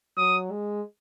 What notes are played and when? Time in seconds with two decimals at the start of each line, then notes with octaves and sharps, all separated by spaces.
0.17 F#3 D#6
0.51 G#3